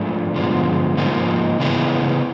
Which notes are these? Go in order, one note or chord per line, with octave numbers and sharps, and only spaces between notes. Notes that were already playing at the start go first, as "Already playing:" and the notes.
Already playing: G#2 F3 A3 D4
G2 D3 F3 G#3 B3
G#2 F3 A#3 D#4
C#3 E3 G#3 B3 E4